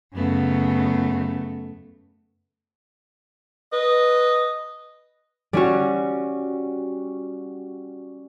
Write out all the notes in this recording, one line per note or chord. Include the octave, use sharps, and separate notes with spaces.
F#2 C#3 A3 B3
B4 D#5
G3 C#4 F#4